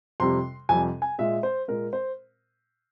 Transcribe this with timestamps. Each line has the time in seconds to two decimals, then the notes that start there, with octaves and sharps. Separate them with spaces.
0.20 F2 C3 G3 C6
0.69 F2 C3 G3 G#5
1.02 G#5
1.18 A#2 G#3 E5
1.43 C5
1.68 A#2 G#3 A#4
1.93 C5